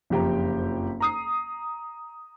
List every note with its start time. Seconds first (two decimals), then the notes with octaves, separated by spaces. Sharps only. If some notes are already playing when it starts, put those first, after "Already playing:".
0.10 F#1 F2 G4 G5 A#5
1.00 A#5 D#6 C7